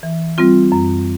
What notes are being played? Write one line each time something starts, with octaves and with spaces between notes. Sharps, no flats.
E3
G3 C4 F4
F#2